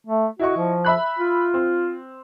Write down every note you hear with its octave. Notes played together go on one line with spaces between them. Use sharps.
A3
E4 F#4 D#5 C#6
F3
E5 B5 F#6
F4
C4